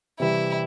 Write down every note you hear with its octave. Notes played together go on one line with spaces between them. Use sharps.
C3 E3 G3 E4